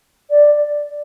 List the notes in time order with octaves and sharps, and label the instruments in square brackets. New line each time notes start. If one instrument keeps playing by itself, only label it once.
[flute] D5